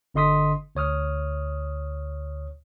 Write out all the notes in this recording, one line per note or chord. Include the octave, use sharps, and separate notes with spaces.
G1 D3 D#5 C6 D#6 B6
D2 C#5 D#6 F6